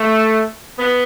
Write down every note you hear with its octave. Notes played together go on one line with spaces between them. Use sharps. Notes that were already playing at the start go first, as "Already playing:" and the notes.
Already playing: A3
B3